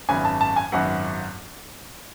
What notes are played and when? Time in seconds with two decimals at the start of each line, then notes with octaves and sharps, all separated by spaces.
0.09 G#1 F#2 C#3 F#3 B3 G#5
0.25 A5
0.41 A5
0.56 G#5
0.72 G#1 F#2 C#3 F#3 B3 F#5